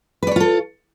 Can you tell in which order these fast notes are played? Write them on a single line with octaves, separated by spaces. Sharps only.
B4 D5 C#5 F4 A4